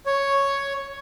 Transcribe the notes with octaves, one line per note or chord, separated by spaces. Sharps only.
C#5